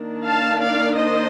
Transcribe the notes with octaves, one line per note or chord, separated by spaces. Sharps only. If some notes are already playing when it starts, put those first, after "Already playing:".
Already playing: D#3 A#3 D4
F5 A5
D5 F5
C5 D#5